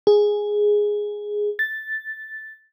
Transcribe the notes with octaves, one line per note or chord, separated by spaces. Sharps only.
G#4
A6